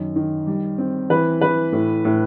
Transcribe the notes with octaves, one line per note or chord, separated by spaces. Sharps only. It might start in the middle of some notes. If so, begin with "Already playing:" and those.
Already playing: F#2 D#3
D#3
G3
C4
E3 B4
E3 B4
A2
A2